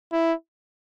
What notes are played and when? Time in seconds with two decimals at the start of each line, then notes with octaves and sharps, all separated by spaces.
0.13 E4